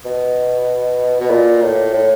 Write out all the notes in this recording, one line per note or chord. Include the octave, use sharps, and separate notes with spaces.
B2
B2
A#2
A2
A2